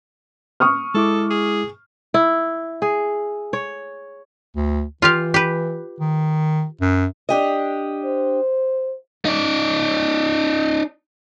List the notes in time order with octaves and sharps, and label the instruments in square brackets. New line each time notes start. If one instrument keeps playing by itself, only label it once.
[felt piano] C#6 D#6 F6
[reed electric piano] G#3 E4 D6 [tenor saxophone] A4
[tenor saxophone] G#4
[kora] E4
G#4
C#5
[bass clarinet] D2
[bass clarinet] E3 [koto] F4 G4 F5
[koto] G4 B4
[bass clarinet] D#3
F#2
[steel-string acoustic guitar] D4 G4 D#5
[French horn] C5
[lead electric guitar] D#4 D5